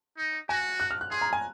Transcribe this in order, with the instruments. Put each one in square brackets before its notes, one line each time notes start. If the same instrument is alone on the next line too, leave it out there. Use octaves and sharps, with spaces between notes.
[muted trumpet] D#4
[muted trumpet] F#4 [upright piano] G#5
[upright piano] F#6
F6
F#6
[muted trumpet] G#4 [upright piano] C6
[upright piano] A#5
G#5